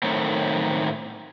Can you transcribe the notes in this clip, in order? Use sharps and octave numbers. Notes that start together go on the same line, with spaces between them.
A2 D#3 F#3 A3 C4